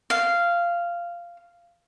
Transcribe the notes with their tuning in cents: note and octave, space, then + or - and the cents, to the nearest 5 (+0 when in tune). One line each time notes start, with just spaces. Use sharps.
F5 -10